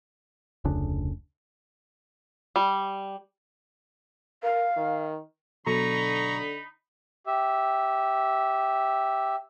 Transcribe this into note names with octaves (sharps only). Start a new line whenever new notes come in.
F1 D2 C#3 D4
G3
A#4 F5
D#3
B2 D3 F#3 D#4 A4 A#5 B5 C#6
G4 E5